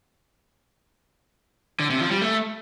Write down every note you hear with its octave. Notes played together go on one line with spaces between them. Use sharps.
D3
C3
F3
G3
A3